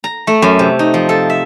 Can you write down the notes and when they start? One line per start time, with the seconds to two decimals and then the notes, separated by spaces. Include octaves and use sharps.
0.04 A#5
0.27 A3
0.42 F#2
0.59 C3
0.79 D#4
0.94 F3
1.09 A4
1.30 E5